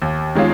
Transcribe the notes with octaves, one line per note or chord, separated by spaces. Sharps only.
D#2
D#3 G#3 C#4 F4